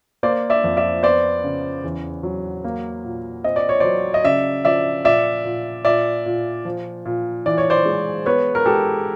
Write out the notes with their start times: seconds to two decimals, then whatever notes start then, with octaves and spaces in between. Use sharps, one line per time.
0.23 A#3 C5 D5
0.50 D5 E5
0.64 F2
0.77 D5 E5
1.03 B3 C5 D5
1.44 C#3
1.84 E2
2.23 F#3
2.64 A#3
3.04 A#2
3.44 C4 D#5
3.56 D5
3.69 C#5
3.80 F#3 C5 D5
4.14 D#5
4.24 C#3 D5 E5
4.65 F3 D5 E5
5.04 A#2 D5 E5
5.45 A#2
5.85 A#2 D5 E5
6.26 A#2
6.65 F3
7.05 A#2
7.46 E3 D5
7.58 C#5
7.70 C5 D5
7.86 G#3
8.26 B3 B4 C#5
8.55 A#4
8.66 G#3 G4 A4